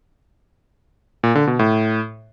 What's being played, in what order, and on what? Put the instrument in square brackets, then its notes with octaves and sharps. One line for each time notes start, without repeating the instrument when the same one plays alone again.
[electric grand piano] A#2
D3
B2
A2